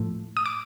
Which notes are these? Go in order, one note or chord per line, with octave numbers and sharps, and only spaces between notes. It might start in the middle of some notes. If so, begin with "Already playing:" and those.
Already playing: A2 F3 A3
D#6
D6